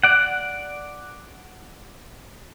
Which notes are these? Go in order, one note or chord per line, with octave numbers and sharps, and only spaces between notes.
D5 F#5